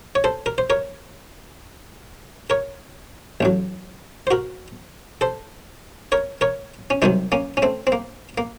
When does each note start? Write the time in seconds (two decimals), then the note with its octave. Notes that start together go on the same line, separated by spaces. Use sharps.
0.15 C#5
0.24 A4 C5
0.46 A#4
0.58 C5
0.70 A#4 C#5
2.50 A#4 C#5
3.41 A1 A2 F#3
4.27 C5
4.31 F#4 A#4
5.21 A4 C5
6.12 A#4 C#5
6.41 A#4 C#5
6.90 C#4
7.02 C2 C3 D#3 F#3 C4 D#4
7.32 A#3 C#4
7.57 C#4
7.62 A3 C4
7.87 C4
7.92 A#3
8.38 A#3